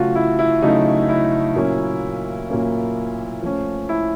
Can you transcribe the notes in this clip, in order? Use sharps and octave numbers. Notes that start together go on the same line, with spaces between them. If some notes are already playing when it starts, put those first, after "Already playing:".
Already playing: C#3 F#3 A3 F4 F#4
E4
E4
C#3 F#3 A3 D#4
E4
A#2 F#3 A#3 C#4
A#2 F#3 A#3 C#4
F3 A3 C#4
E4